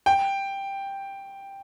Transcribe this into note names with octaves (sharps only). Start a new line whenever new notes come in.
G5